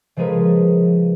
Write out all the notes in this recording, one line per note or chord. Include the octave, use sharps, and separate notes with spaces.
C#3 F3 G#3 G#4 A#4 B4